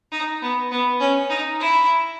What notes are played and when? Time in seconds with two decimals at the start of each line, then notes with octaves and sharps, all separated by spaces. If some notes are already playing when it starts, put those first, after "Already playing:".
0.12 D#4
0.42 B3
0.71 B3
1.00 C#4
1.30 D#4
1.60 E4